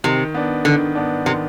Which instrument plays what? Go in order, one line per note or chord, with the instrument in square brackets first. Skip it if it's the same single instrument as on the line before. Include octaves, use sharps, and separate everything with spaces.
[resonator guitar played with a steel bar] C3 [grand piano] D#3
[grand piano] B3 D4
[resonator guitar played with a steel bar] D3 [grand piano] D#3
[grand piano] B3 D4
[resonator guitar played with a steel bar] C3 [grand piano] D#3